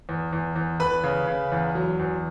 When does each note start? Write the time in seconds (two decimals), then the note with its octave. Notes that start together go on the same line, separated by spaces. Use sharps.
0.09 E2
0.33 E2
0.56 E2
0.80 E2 B4 B5
1.04 C#3
1.28 C#3
1.52 E2
1.75 F#3
1.99 E2